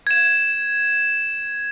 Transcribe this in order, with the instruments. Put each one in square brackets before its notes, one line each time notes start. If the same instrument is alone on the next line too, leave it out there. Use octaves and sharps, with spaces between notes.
[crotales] G#6 E7